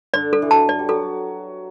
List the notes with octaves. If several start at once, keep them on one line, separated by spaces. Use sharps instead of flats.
D3 D5
A4
E3
F#3 A5
D5
G3
F#3 A4